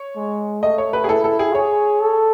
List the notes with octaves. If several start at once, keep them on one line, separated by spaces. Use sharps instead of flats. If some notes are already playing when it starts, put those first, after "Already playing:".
Already playing: C#5
G#3
A3 D#5
C#5
B4
G#4
E4 A4
A4
G#4
G#4 C#5
A4